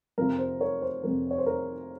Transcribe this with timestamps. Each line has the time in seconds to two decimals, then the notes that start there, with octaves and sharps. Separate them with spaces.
0.18 F2 C3 F3 A#4
0.39 C5
0.60 A#4 C#5
0.82 C5
1.03 F2 C3 F3 A#4
1.31 C#5
1.38 C5
1.46 A#4